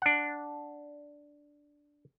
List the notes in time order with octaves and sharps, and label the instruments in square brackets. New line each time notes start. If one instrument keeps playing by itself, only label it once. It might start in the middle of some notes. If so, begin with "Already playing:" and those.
[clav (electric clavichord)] D4 F#5